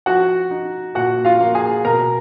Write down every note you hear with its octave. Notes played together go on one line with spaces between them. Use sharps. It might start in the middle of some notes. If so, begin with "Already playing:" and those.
F3 F#4 F#5
D#4
A#2 F#4 F#5
F4 F5
A#3
G#4 G#5
B2 A#4 A#5